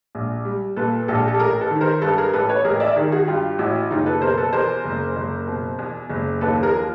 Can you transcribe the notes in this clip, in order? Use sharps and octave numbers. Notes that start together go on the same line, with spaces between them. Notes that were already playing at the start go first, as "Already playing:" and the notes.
A#1
G3
A#2 A4 B4
A#1 G4 A4
A4
A1 G#4 A#4
A4 B4
D#3
A#4 C5
G2 A4 B4
G#4 A#4
A1 A4 B4
B4 C#5
A1 G#4 A#4
D5 E5
D#3 G#4 A#4
F#4 G#4
G2 F4 G4
A1 E4 F#4
F#1 D#4 F4
A4 B4
B2 A#4 C5
A4 B4
E2 A#4 C5
F#1
F#1
B2
E2
F#1
D#2 A4 B4
G#4 A#4
F3